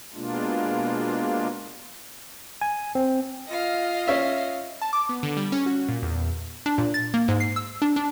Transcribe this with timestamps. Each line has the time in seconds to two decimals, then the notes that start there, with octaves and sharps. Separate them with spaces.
0.14 B2 G#3 A#3 D4 F4
2.61 G#5
2.95 C4
3.47 F4 D#5 F5
4.07 C#4 E5
4.82 A5
4.93 D6
5.09 B3
5.23 D3
5.37 G3
5.52 C#4
5.66 F#4
5.89 A#2
6.02 E2
6.66 D4
6.78 A#2
6.94 A6
7.14 A#3
7.28 G#2
7.40 C7
7.56 E6
7.82 D4
7.96 D4